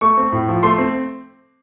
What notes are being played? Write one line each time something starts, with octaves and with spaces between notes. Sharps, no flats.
A3 C#6
C4
A2
F3
A3 C6
C4